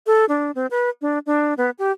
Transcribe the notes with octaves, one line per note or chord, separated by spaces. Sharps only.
A4
D4
C4
B4
D4
D4
B3
G4